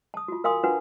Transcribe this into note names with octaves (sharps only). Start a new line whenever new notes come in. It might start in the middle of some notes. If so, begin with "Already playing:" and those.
A5 D#6
F4 F#4
A#4 F5 G#5 C6 D#6
D4 F4 F#4 B4 F#5 G#5